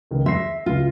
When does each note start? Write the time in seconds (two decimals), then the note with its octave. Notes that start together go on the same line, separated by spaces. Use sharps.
0.11 C#2 D#3
0.26 E5 C6 A#6 C7
0.66 C#2 F4